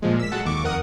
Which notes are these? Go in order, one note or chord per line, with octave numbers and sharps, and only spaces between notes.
A#2 F3 G#3
E6 B6
F#3 G#3 A4 F#5 A5
D#2 C#6 D6
F2 A#4 F#5 D#6